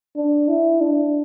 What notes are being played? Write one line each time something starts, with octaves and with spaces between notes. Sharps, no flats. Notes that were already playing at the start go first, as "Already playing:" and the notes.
D4
E4
D4